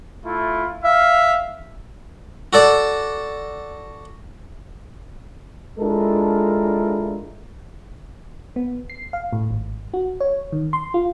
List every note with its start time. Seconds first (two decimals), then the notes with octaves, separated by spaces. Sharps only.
0.25 A3 E4 F4
0.84 E5 F5
2.53 F#4 A4 D5
5.79 G#3 D4 E4 F4 A4 A#4
8.56 B3
8.90 C7
9.13 F5
9.33 A2
9.51 G#1
9.94 F#4
10.20 C#5
10.52 D#3
10.73 C6
10.94 F4